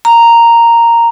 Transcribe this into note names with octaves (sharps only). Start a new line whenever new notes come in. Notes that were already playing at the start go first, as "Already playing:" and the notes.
A#5